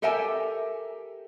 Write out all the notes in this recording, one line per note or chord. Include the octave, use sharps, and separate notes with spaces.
G4 A4 A#4 E5 G5 G#5